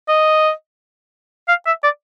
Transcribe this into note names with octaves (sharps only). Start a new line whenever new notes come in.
D#5
F5
E5
D5